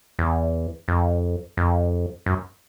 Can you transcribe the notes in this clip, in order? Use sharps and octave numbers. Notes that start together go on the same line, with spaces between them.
E2
F2
F2
F#2